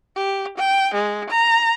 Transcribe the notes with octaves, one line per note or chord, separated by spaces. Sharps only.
G4
G5
G#3
A#5